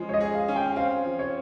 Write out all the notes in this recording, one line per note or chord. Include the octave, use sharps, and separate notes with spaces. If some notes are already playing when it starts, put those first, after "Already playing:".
Already playing: F3 G#3 C#4
C#5
D#5
G#4
F5
C#4
G5
C4 F5
F3
C#5